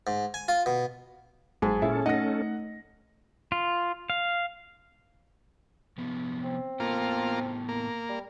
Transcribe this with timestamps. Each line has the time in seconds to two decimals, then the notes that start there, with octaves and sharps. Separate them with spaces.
0.07 G#2
0.34 G#5
0.48 F4
0.66 B2
1.62 G1 G#2 F#3 G#4 A5
1.82 A#2 C#4 E4 A4
2.06 A3 D#4 D#5 F#5 A#6
3.52 F4
4.10 F5
5.98 C3 F3 B3
6.43 C4
6.80 A2 A#3 B3 F4 A4
7.69 A#3
8.09 G3